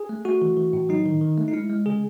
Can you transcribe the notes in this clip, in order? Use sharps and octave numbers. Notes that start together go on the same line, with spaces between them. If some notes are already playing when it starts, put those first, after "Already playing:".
Already playing: G#4
A3
A3 F#4
E3
E3
A2
F#3 D#4
D#3
D#3
A3
D#4
G#3 E4
G#3
C#3 G#4